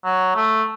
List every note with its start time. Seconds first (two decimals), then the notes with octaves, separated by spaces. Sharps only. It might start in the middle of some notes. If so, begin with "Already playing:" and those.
0.05 F#3
0.36 A3